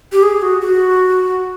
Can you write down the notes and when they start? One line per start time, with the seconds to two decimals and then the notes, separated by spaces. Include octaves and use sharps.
0.12 G4
0.23 G#4
0.42 F#4
0.61 F#4